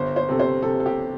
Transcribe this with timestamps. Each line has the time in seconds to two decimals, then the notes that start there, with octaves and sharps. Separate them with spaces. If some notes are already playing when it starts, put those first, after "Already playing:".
Already playing: G1 C5
0.16 C5
0.28 C3 A4
0.39 C5
0.63 C3 A4
0.80 A4
0.86 G4